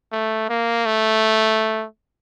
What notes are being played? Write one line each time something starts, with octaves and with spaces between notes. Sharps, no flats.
A3
A#3
A3